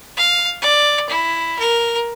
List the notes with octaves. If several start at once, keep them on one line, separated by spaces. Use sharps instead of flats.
F5
D5
E4
A#4